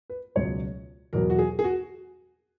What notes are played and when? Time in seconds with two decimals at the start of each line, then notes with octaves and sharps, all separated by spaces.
0.10 B4
0.35 C#2 B2 F#3 C#5
1.13 E2 B2 F#3 A#4
1.30 F#4
1.39 G#4
1.59 G#4
1.64 F#4